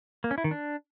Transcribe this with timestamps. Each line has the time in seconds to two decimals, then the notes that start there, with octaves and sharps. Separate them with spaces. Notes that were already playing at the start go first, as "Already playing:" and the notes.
0.24 A#3
0.31 C#4
0.38 E4
0.44 D#3
0.51 D4